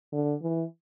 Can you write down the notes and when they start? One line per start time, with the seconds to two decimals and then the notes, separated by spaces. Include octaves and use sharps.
0.12 D3
0.42 E3